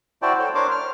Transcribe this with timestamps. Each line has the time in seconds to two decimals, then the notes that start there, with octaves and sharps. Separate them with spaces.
0.22 E4 F#4 C5 D5 G5 A5
0.39 A4 C5 C#5 G5
0.55 D4 A#4 C5 C#5 C6 D6
0.71 F6